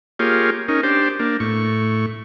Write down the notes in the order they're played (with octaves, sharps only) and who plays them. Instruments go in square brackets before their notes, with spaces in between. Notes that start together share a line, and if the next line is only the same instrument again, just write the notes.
[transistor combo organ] A#3 F4 G4 G#4 C#5
C#4 D#4 A#4
D4 G4 C5
A#3 D4
A2 C#6